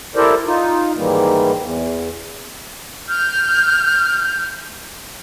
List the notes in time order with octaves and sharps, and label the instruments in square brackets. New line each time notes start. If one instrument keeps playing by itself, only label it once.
[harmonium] E4 G4 A4 A#4 C5 D5
D#4 F4
G#2 D#3 E3 G3 A#3
E2
[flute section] F6 G6